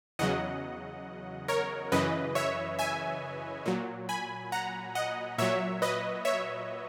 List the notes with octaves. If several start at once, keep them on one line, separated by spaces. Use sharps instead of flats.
E2 C#3 F#3 D#5 F#5
A#4 C#5
F#2 C#3 E3 B4 D#5
C#5 E5
E5 G#5
A#2 F#3
G#5 B5
F#5 A#5
D#5 F#5
A#2 F#3 C#5 E5
B4 D#5
C#5 E5